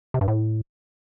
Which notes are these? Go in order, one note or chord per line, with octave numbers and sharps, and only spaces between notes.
C3
G2
A2